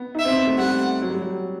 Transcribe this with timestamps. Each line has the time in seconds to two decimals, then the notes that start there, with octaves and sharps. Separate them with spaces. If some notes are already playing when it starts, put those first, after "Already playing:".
Already playing: B3
0.15 D#4 E5
0.25 C4
0.37 B3
0.47 A3
0.58 G3 F#5
1.02 F#3
1.10 G3
1.23 F#3